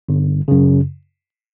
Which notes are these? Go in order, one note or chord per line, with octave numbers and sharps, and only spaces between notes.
G1
F#2 C#3